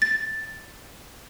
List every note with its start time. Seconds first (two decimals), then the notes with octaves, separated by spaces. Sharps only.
0.02 A6